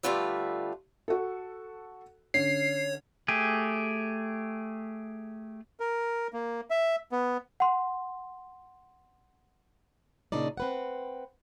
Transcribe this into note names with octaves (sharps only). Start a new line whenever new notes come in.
D3 G3 A3 F4 B4 E5
F#4 A4
D3 C#4 C#5 C7
A3 G4 G#4
A#4
A#3
E5
B3
F#5 C6
A#2 C#3 D4 D#4 D5
C4 B4 F#5